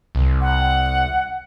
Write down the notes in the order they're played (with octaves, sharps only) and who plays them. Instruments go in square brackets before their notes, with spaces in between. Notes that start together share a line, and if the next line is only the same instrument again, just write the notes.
[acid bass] C2
[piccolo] F#5